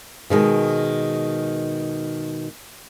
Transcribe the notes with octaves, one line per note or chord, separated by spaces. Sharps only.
B2 D#3 G#3